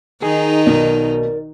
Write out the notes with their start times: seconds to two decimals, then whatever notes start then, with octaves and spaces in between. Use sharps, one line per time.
0.22 D#3 D#4 G#4 G#5
0.66 B1 B2 A#4 D5